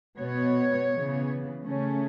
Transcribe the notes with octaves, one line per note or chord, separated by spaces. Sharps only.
B2 B3 C#5
C#3 E3 B3
C#3 A3 C#4